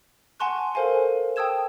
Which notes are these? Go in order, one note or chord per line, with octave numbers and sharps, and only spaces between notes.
F#5 G#5 A5 C6 C#6 F#6
A4 A#4 C5 F5 G#5
G5 A5 D#6 E6 G#6 E7